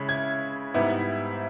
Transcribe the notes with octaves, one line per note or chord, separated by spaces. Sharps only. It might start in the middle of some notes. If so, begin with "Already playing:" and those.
Already playing: C#3 G#3 C#4 E4
G#6
G#2 G3 B3 E4